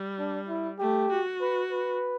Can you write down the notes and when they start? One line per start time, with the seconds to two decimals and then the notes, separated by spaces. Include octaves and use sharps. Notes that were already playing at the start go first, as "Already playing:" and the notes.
Already playing: G3
0.19 D4
0.48 E4
0.79 A3 G4
1.10 F#4
1.41 B4
1.71 B4